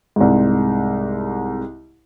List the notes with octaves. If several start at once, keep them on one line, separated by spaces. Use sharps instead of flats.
C2 G#2